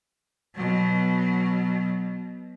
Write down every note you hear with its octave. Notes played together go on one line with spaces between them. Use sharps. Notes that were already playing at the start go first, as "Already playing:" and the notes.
B2 F#3